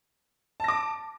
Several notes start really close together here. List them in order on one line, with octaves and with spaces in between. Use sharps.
A5 A#6 D6